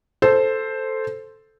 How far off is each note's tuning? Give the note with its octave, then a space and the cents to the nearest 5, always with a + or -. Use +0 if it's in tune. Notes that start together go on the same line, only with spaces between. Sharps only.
A4 +0 C5 +0